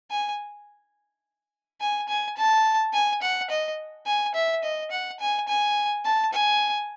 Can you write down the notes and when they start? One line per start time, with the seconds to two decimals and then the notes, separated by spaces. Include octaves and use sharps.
0.11 G#5
1.81 G#5
2.08 G#5
2.37 A5
2.93 G#5
3.22 F#5
3.50 D#5
4.06 G#5
4.35 E5
4.63 D#5
4.91 F#5
5.20 G#5
5.48 G#5
6.05 A5
6.33 G#5